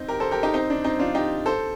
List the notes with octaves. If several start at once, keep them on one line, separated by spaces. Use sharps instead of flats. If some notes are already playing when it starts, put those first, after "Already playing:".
Already playing: C4 D#4
G4 A#4
A4 C5
G4 A#4
D#4 G4
C4 D#4
D4
C4 D#4
D4 F4
D#4 G4
A4 C5